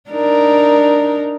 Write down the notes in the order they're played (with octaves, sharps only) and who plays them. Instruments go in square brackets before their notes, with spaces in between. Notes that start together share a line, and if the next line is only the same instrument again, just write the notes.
[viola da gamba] D4 D#4 A#4